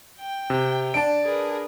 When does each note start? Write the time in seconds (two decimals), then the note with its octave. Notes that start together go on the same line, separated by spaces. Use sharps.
0.20 G5
0.50 C3
0.94 D4 A5 D7
1.24 G#4 A#4 B4